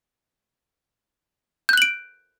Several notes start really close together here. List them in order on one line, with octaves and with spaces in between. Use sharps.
G6 F#6 F#7 D7